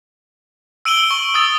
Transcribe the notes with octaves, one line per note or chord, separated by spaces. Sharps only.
E6 D7 D#7 F#7 G7
E6
C#6
D#6 E6 A6